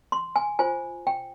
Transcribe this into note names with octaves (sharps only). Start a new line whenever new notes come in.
C6
G#5
F4 C5 G#5
G5